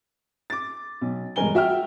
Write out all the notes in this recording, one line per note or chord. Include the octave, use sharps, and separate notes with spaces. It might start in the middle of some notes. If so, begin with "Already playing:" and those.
D6 A6
B1
E1 G2 G#3 A#4 G#5 G7
F#4 E5 G5 F6